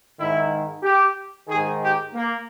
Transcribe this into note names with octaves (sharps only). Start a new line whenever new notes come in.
G#2 D#3 E4
G4
D#3 G#4
G#2
G4
A#3